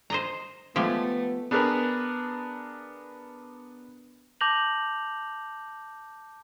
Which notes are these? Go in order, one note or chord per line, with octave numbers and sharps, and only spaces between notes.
C5 D#5 A#5
F3 G#3 A3 B3 G4
B3 D4 G#4 A#4 B4
A5 D6 G6 A#6 F7 F#7